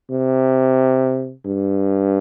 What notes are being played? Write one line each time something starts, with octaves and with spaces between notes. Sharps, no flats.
C3
G2